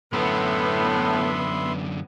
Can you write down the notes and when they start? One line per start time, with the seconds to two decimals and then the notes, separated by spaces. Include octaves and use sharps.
0.13 F#2 A2 D3 B3 E5 B5 C6